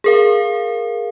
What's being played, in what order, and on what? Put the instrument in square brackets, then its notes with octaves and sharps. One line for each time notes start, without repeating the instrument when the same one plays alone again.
[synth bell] G#4 A#4 F5